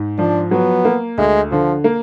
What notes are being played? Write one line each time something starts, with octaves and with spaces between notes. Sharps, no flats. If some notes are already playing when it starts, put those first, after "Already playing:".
Already playing: G#2
F3 D4
F#3 B3
A#3
D2 G#3
D3 F3
A#3